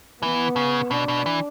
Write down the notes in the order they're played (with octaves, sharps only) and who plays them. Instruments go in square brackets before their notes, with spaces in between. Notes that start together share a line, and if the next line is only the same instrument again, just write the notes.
[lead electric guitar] E3 [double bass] B3
[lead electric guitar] C#3
[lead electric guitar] B2 [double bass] D4
[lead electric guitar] B2
E3